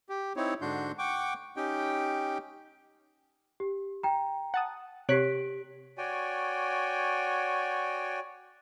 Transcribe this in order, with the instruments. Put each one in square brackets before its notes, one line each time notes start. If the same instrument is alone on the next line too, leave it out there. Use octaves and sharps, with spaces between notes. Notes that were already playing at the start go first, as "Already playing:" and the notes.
[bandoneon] G4
C4 D#4 E4 C#5
G#2 D3 D4 F#4 C6 G6
F#5 G5 C#6 D6
C#4 D#4 G4 G5
[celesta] G4
G5 A#5
[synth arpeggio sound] F#5 A5 D#6
[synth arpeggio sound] C3 C#5 F#6 [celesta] G4 B6 D7
[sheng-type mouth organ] F#4 C#5 D5 G5 G#5